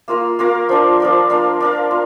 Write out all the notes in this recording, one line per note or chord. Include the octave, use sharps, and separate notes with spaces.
A#3 F4 A#4 F5
A#3 F4 A#4 F5
F3 D4 A#4
F3 D4 A#4
D4 A#4 F5
D4 A#4 F5
F4